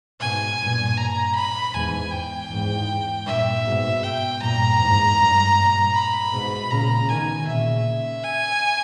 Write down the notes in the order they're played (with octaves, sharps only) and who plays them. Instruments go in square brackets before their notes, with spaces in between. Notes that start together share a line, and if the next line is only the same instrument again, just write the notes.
[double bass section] G#2 B2 [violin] G#5
[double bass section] G2 A#2
[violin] A#5
B5
[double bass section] E2 G#2 [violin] G#5
[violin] G5
[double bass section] E2 G#2
[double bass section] G2 A#2 [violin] E5
[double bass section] G#2 B2
[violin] G5
[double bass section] G2 A#2 [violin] A#5
[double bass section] E2 G#2
G2
G2 A#2
[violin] B5
[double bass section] G#2 B2
[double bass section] A#2 C#3 [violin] A#5
[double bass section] B2 D#3 [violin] G#5
[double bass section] A#2 C#3 [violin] E5
[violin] G#5